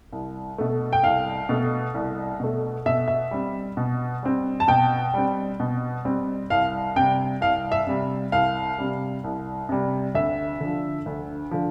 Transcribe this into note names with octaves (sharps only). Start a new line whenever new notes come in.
C2
B2 A3
G5
C2 F5
B2 A3
C2
B2 A3
B2 E5
E5
G3 C4
B2
G3 C4
A5
B2 G5
G3 C4
B2
G3 C4
C2 F5
C3 G3 G5
C2 F5
E5
C3 G3
C2 F5
C3 G3
C2
C3 G3
D2 E5
D3 F3
D2
D3 F3